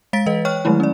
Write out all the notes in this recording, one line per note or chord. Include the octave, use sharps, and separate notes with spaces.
G#3 F5 A6 B6 D7
E3 B4 D#5
C#5 G5 C#6 F6 F#6
D#3 F#3 G#3 A3 E4
C#4 D5